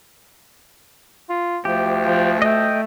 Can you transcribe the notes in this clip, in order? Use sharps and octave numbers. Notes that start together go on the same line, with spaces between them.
F4
D2 F3 G4
F3
A3 D#5 G5